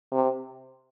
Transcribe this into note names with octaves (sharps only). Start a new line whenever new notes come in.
C3